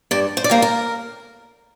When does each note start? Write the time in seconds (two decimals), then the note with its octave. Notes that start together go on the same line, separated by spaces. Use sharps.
0.11 G2 D5
0.37 C5
0.44 D5
0.50 G3 A#3 C5
0.62 A#4